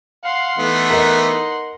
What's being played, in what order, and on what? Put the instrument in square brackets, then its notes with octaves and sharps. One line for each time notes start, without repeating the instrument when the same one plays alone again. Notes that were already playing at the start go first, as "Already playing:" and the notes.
[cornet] F5 [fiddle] F#5 C6
[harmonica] E3 A3 B3 [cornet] D#4
[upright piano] A#4 D#5